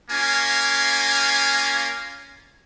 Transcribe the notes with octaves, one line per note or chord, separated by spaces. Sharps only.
A#3 C#4 F4 G#5